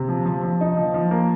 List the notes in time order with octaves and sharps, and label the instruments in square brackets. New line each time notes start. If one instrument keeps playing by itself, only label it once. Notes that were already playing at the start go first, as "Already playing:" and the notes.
Already playing: [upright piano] C3
F3
F3
F3
D#4
F3
F3
A#3